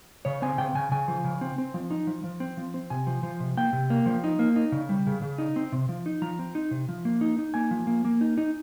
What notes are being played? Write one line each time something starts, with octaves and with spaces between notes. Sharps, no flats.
C#3 C#5
C4 G#5
C#3 G5
C#3 G#5
C#3 G#5
F3
C#3
C4
C4
F3
D#4
F3
F3
C4
F3
C4
C3 G#5
F3
F3
C3
A#3 G5
C3
A#3
F3
D#4
A#3
D#4
C#3
G3
C#3
C#3
D#4
C4
C3
F3
D#4
F3 A#5
C4
D#4
C3
F3
A#3
D#4
D#4
A#3 G#5
F3
A#3
A#3
D#4
D#4